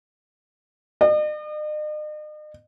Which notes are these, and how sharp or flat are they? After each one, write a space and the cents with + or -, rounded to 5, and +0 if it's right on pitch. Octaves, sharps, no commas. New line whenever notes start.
D#5 -45